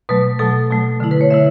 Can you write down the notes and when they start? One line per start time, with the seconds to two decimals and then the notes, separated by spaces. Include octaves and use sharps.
0.09 B2 F#3 A3 B4
0.39 B2 F#3 A3 A4
0.70 B2 F#3 A3
1.00 D3 A3 E4
1.11 B4
1.21 C#5
1.30 D3 A3 E4 E5